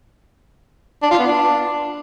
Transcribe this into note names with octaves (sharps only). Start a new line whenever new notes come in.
D4
F4
B3
D4